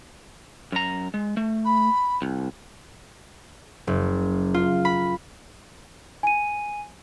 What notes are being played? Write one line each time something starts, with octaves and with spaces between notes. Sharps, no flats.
F#2 A#5
G#3
A3
B5
C2
F#1
F4
B5
G#5 D#7